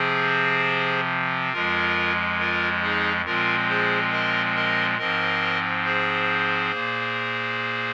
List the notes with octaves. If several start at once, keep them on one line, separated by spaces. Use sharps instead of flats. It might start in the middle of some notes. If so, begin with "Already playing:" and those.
Already playing: C3 F3 C4 G#4 C5
F2 F3 G#3 F4 A#4
F4 A#4
D#4 G#4
A#2 F3 G#3 C4 F4 A#4
G#4 C5
A#4 D#5
A#4 D#5
G#2 F3 C4 A#4 D#5
G#4 C5
A#2 A#3